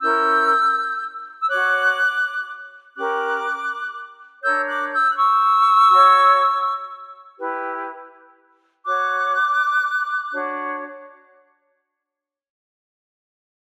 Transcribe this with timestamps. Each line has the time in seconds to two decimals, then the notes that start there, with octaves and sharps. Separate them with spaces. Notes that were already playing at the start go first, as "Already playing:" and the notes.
0.01 C#4 E4 A#4 E6 G6
1.40 E6
1.49 F#4 C#5 D6 F#6
2.95 C#4 G4 A#4 D6 F#6
4.43 D4 A#4 C#5 E6 G6
4.68 D6 F#6
4.93 E6 G6
5.11 F#6
5.17 C#6 E6
5.90 F#4 C#5
7.38 E4 G4 B4
8.85 F#4 C#5 D6 F#6
10.33 D4 F#4 C#5